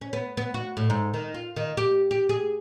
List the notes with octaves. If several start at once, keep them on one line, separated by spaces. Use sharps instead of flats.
C#4
B3
B3
F#4
A2
G#2
D#3
F4
D#3
G4
G4
G#4